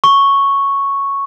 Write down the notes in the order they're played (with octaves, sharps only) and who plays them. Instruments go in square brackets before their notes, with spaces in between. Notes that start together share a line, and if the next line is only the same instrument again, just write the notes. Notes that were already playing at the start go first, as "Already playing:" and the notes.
[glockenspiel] C#6